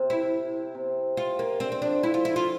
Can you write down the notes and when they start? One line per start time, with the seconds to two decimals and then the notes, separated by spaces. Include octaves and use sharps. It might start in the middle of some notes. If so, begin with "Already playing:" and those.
Already playing: C3
0.10 E4
0.75 C3
1.17 F4
1.39 A#3
1.60 D3 C4
1.72 C4
1.82 F3 D4
2.03 E4
2.14 F4
2.25 E4
2.36 F4